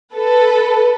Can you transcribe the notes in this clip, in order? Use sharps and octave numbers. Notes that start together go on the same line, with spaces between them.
A4 B4